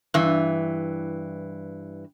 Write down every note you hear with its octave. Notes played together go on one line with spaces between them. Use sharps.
G2 E3